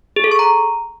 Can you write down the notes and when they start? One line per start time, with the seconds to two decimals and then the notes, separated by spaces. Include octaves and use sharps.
0.16 G#4
0.24 A4
0.31 C#6
0.39 A#5